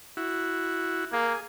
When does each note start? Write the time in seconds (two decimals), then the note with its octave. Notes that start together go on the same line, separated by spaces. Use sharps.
0.17 E4 F#4
1.13 A#3 G#4